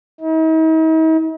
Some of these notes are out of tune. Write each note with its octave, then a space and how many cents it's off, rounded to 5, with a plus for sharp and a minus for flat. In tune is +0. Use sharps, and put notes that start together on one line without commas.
D#4 +45